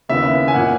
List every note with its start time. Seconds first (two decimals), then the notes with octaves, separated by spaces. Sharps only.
0.09 D#2 C#3 E3 B3 E5
0.48 G#5
0.54 A#2 A#3 F#5